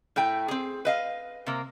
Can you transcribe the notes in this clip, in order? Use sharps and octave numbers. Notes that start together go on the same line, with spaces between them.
A2 A3 G5
C4 G#4
B4 D#5 F5
C3 A#3